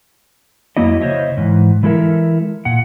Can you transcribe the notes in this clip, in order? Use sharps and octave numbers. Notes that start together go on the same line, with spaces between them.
F2 F#3 A#3 E4 D#5
C#3 C5 C#5 D#5 E5
G#2 E3
E3 G#3 E4 A4 A#4 E5
A#2 F#5